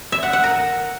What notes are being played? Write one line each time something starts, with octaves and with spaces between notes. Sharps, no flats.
E5
F#5
F#5
A#4